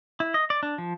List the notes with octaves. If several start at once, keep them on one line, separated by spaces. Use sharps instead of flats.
E4
D#5
D5
D4
F3